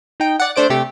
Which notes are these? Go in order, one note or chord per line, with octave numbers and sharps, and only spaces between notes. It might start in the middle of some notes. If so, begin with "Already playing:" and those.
D#4 G5
D5 F#5
A3 D4 C5 D5 D7
C3 A3 G4